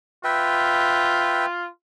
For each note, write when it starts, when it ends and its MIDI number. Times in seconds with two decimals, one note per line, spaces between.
0.24 1.67 65
0.24 1.46 71
0.24 1.46 76
0.24 1.46 79